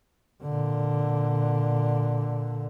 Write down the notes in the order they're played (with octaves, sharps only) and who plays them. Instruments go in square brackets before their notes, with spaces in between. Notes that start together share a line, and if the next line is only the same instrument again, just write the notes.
[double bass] A#2 D3